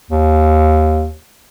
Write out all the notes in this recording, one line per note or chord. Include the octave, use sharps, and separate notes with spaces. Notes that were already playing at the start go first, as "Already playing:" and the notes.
D#2